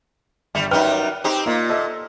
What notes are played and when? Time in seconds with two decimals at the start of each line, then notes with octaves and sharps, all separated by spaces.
0.55 G1 G3
0.71 F#2 G3 D#4 B4 G5 F6
1.24 C4 D#4 G4
1.46 A#2 A#3 D#4 F4
1.69 A4 D#5 E5